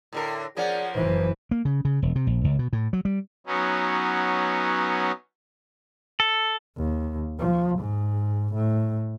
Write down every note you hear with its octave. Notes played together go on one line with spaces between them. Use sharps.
A2 D3 A#4
F3 A#3 C#4 G#4 D5 F#5
F#1 E3 B4 C5
A#3
C#3
C#3
E1
C3
A#1
C#2
B2
A2
F#3
G3
F#3 B3 C#4 D#4
A4
D#2
F3
G#2
A2